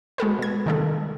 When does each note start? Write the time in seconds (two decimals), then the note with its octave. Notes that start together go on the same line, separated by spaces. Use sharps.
0.18 G#3 F#4 A4 B4
0.39 B2 G#6
0.66 C3 D#3 G3 G#3 A#3 A4